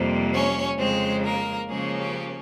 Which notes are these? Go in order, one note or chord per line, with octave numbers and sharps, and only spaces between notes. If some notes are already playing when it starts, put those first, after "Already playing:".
Already playing: F2 C3 G3 A#3
C#4 C#5
F2 C#3 G#3 C4 C5
A#3 A#4
C#3 F3 G#3 A#3 C#4 G#4
G4